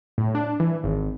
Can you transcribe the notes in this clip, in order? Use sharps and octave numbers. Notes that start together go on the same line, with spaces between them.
A2
D4
E3
G#1